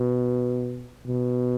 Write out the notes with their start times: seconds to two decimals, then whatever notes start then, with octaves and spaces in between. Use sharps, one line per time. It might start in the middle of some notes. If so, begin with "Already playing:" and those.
Already playing: B2
1.07 B2